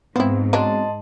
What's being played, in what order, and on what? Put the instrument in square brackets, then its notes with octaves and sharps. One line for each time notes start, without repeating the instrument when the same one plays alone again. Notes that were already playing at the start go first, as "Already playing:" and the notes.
[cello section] G#2 [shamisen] F3 E4 [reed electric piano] B3 C4
[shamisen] F#3 G#3 D4 [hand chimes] D#5 A5 C6